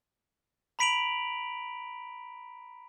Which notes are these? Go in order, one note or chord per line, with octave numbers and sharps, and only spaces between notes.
A#5 B5 B6 D7 F7 F#7